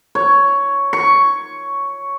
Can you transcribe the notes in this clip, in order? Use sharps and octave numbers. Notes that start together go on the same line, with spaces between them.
C#5
C#6